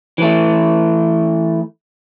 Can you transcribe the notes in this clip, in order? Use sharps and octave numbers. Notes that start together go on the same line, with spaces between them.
E3 A3